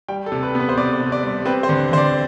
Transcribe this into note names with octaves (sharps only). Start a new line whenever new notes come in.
G3 G5
A4
C3
B4
B3
B4
C5
C3 D5
C3
D5
G3
C4 B4
C5
D3
D3 C5
D5